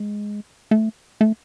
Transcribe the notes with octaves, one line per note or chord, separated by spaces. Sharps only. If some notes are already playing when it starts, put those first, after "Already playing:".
Already playing: G#3
A3
A3